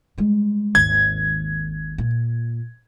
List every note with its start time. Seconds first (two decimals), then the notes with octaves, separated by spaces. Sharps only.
0.18 G3 G#3
0.75 G#1 D#2 G#6
1.98 A#2